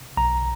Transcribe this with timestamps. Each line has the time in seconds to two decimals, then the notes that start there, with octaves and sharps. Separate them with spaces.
0.17 B1 A#5